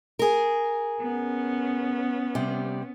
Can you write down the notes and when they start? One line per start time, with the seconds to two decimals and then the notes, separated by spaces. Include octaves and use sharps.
0.19 G#4 A#4
1.01 B3 C#4
2.35 C3 G3